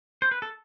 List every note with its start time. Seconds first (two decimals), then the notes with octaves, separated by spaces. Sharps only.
0.22 C5
0.31 B4
0.42 A4